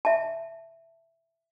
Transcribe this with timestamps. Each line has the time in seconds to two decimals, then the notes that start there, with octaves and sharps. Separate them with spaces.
0.05 E5 A5